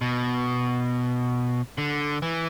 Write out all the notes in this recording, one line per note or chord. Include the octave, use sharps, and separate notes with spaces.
B2
D3
E3